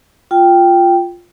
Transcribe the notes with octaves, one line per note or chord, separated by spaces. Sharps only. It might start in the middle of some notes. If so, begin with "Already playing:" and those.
F4 G5